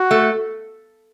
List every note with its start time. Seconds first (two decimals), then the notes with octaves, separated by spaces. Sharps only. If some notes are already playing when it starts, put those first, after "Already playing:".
Already playing: F#4
0.11 A3